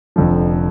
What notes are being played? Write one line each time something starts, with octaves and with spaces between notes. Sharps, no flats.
F1 F2 D3 F3